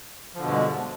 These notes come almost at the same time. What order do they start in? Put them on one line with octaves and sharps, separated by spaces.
F3 D3 B2 G2 G#3